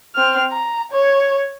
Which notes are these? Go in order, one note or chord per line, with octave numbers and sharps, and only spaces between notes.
C4 F6
A#5
C#5